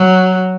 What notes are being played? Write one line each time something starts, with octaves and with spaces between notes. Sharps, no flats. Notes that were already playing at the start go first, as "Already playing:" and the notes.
Already playing: F#3